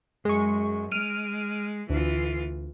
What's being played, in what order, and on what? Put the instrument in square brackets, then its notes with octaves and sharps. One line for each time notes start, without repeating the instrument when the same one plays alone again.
[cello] F#2 [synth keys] G#3 C#6
[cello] G#3 [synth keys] F6 D7 D#7
[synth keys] D2 [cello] E3 F4